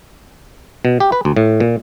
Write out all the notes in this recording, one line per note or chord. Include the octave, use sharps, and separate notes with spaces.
B2
G4
B4
D2
A2
A#2